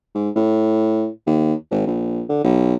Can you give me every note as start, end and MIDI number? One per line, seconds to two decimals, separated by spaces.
0.15 0.29 44
0.36 1.08 45
1.26 1.54 39
1.71 1.84 32
1.87 2.23 34
2.29 2.41 50
2.44 2.74 35